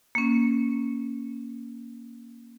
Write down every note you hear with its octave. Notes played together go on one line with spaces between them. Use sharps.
A#3 C#4